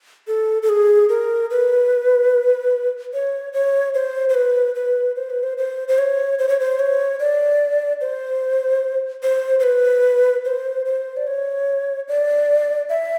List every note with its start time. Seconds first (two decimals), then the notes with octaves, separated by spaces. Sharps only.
0.28 A4
0.63 A4
0.69 G#4
1.09 A#4
1.51 B4
3.14 C#5
3.53 C#5
3.94 C5
4.29 C5
4.34 B4
4.75 B4
5.16 C5
5.30 B4
5.43 C5
5.58 C5
5.88 C5
5.98 C#5
6.39 C5
6.49 C#5
6.60 C5
6.79 C#5
7.20 D5
8.01 C5
9.23 C5
9.60 C5
9.63 B4
10.45 C5
10.85 C5
11.17 D5
11.27 C#5
12.08 D5
12.89 E5